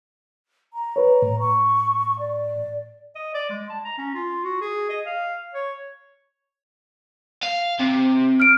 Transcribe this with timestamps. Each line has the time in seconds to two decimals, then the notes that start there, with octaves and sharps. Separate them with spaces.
0.74 A#5
0.96 B4 C#5
1.22 A2
1.40 C#6
2.19 D5
3.15 D#5
3.34 D5
3.50 G#3
3.70 A5
3.85 A#5
3.98 C#4
4.15 F4
4.44 F#4
4.61 G#4
4.89 D#5
5.06 F5
5.54 C#5
7.43 F5
7.80 C3
8.40 F6 D7